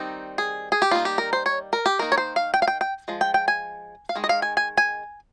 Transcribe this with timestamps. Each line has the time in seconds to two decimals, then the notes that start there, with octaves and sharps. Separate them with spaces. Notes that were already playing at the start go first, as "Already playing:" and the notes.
Already playing: D#3 G3 C4 D#4
0.38 G#4
0.72 G#4
0.82 G4
0.91 D#3 G3 A#3 D#4 F4
1.05 G4
1.18 A#4
1.33 C5
1.46 C#5
1.73 A#4
1.86 G4
1.99 D#3 A#3 D#4 A#4
2.12 C#5
2.18 C5
2.36 F5
2.54 G5
2.62 F5
2.67 G5
2.81 G5
3.08 F3 G#3
3.21 G5
3.34 G5
3.48 G#5
4.09 F5
4.15 D#3 G#3
4.24 D#5
4.29 F5
4.42 G#5
4.57 G#5
4.77 G#5